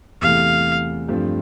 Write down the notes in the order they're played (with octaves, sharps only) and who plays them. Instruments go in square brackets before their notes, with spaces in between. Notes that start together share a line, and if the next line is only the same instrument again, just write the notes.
[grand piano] E2 C3 E3 A3 [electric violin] F5
[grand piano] G2 F3 A3 C4